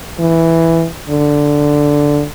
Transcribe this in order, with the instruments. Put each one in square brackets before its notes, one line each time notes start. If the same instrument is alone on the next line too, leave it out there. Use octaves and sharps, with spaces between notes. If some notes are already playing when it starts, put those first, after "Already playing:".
[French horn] E3
D3